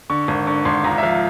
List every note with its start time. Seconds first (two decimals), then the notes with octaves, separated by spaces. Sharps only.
0.10 D3 C#6
0.28 G#1
0.47 D3 C#6
0.65 G#1 C6
0.84 C#2 A#5
0.98 E5
1.03 F3 F5